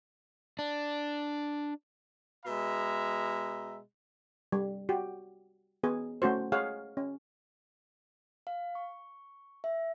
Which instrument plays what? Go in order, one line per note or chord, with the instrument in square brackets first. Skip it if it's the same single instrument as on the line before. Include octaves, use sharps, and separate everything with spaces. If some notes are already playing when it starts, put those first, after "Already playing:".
[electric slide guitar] D4
[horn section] B2 G#3 E5 A#5
[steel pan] G3
F#4 G4
B3 G#4
A3 C#4 F#4 C5
G#4 C#5 F5 F#5
C#4
[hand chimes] F5
C#6
E5